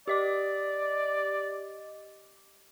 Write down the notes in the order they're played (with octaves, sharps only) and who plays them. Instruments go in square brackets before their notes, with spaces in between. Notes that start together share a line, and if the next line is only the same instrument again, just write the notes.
[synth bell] G4 D#5 D6 [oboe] D5